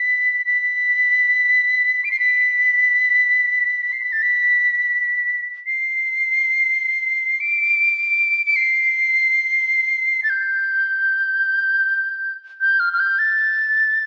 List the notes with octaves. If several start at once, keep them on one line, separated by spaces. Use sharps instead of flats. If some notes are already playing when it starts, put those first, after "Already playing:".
Already playing: B6
B6
D7
C7
B6
C7
B6
A6
B6
C7
D7
D7
C7
A6
G6
G6
F6
F6
G6
A6